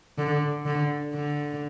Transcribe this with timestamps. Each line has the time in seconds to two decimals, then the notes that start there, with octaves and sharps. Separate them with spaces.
0.18 D3
0.66 D3
1.14 D3